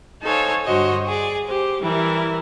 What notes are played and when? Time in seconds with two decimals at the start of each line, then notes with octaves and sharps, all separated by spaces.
0.24 D#4 A4 C5 C#5 F5 G#5
0.65 G2 D3 F#4 C5 C#5 D#5
1.08 G#4 D5
1.46 G4 C5
1.82 E3 G3 E4 A#4